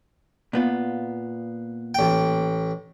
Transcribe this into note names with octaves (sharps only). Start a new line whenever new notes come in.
A#2 B3 F4
A1 G5